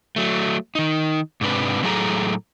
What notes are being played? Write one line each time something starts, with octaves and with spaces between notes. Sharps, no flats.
F#3 A3
D#3 D#4
G#2 C3 D4 B4
A2 F#3 G#4 A4 F5 A#5